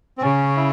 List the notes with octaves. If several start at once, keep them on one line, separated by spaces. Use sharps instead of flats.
C4
C#3 C#4
E4